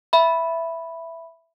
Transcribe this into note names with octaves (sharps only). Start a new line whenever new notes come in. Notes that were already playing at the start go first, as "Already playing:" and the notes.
E5 B5